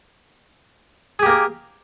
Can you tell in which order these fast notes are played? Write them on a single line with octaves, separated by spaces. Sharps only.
G#4 G4 A#3 A#4